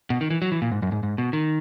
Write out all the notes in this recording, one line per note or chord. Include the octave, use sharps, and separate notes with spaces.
B2
D#3
E3
F#3
E3
A#2
G#2
F#2
G#2
G#2
B2
D#3